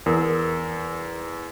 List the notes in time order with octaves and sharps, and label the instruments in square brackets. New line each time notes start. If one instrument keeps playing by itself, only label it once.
[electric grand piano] E2 [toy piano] A#4